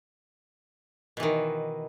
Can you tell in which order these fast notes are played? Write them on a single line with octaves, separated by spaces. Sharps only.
B2 E3 D#3